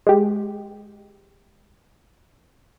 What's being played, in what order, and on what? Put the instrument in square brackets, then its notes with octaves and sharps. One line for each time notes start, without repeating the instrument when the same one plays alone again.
[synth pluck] G#3 G4